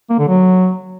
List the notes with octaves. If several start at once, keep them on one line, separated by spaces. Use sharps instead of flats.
A#3
D3
F#3